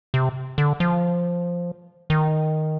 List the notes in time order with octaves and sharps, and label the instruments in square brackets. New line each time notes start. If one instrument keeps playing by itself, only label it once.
[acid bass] C3
D3
F3
D#3